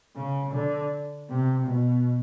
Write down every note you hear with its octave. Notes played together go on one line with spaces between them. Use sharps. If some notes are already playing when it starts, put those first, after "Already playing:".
C#3
D3
C3
B2